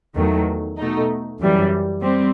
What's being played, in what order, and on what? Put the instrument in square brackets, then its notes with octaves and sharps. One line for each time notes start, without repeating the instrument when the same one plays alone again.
[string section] E2 D#3 F#3 A3
B2 A3 D#4
F#2 E3 G3
G3 C4